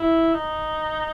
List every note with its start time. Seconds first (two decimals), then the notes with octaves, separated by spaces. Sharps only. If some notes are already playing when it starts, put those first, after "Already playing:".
Already playing: E4
0.34 D#4